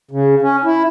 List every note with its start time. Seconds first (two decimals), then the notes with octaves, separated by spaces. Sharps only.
0.11 C#3
0.42 C#4
0.64 E4